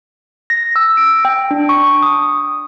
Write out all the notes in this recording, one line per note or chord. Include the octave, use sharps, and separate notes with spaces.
A#6
E6
D7
G5
D4
C#6
D#6